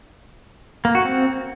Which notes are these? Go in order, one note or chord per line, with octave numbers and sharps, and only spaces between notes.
A#3
F#4
C4